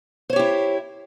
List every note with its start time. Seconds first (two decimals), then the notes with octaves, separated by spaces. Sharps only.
0.30 C5
0.33 C#5
0.36 G4
0.39 E4